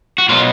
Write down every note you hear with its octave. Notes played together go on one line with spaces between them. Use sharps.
F#4
B2 F#3 F4